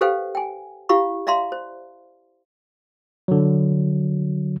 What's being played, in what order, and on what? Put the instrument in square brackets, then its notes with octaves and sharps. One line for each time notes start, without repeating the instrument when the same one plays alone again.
[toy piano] G4 A4 B4 C5 F5 G5
G5 G#5
E4 G4 F5 B5 C#6
D5 E5 F5 A#5 C6
C5
[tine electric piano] D3 F#3